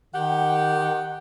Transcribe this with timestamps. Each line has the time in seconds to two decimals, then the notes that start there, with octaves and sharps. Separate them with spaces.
0.14 D#3 G4 F#5